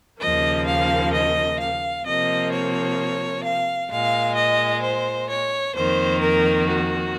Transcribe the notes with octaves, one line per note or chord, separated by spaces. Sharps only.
D#2 C#3 F3 A#3 D#5
F5
D#5
F5
C3 F3 A#3 D#5
C#5
F5
A#2 G#3 F5
D#5
C5
C#5
F2 D#3 A#3 C5
A#4
F#4